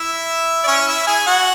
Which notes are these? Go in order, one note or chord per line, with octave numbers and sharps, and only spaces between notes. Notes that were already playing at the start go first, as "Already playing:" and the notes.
Already playing: E4 E5
D5
C#4 C#5
E4 E5
G#4 G#5
F#4 F#5